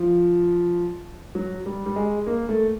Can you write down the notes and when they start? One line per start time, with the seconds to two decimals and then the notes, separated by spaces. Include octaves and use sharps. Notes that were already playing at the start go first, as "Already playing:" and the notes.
Already playing: F3
1.35 F#3
1.66 G3
1.86 G3
1.96 G#3
2.27 A#3
2.49 A3